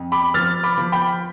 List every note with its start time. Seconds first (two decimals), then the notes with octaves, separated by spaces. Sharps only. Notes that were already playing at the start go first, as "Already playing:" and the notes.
Already playing: F2
0.12 B5 D6
0.34 F3 F6 A6
0.63 B5 D6
0.78 F3
0.92 G5 B5